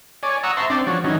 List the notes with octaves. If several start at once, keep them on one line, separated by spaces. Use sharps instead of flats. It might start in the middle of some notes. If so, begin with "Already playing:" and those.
C#5 D5 G#5
F#5 A#5 C#6 D#6 E6
C5 E5 A5 A#5 C6 C#6
C4 D4 C5 D5
F3 D4 F#4 C#5
E3 F#3 C#4 D#4